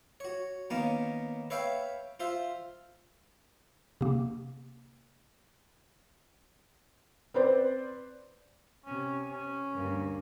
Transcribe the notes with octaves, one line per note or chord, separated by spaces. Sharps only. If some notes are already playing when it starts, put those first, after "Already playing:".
F#4 C#5
D#3 A#3 B3 C#4
B4 C#5 E5 F5 G5
F4 C5 E5
C3 A#3
C4 B4 C5 D5
C3 C#4
C#4
D2 G2 A#3